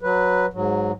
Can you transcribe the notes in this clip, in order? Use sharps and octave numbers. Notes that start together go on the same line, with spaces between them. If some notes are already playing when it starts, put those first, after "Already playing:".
F#3 B4
G#2 F#3